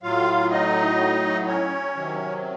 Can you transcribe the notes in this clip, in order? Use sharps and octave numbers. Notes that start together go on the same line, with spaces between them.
A2 F#3 F4 F5
D#4 D#5
C#4 C#5
C3 D#3 F#3